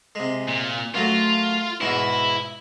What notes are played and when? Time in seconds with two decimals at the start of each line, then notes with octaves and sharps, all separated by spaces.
0.15 C3 G#3
0.48 A#2
0.94 F#2 F#3 A3 F4
1.81 E2 G#2 B2 E4